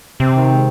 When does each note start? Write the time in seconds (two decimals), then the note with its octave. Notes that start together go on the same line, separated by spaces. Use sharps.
0.20 C3 C4
0.34 D#3
0.49 G#3